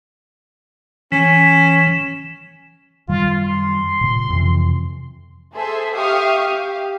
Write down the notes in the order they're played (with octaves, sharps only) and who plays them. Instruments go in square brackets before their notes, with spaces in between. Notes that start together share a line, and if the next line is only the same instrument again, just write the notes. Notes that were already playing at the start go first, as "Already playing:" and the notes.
[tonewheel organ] E3 [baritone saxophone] C#4
[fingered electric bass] F#2 D#3 G3 [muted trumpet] F4
[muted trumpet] C6
[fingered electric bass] A#2 C#3
F2 C3 E3
[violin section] G#4 A4 C5 E5 C6
G4 E5 F5 C#6 D#6 F6
G4 F5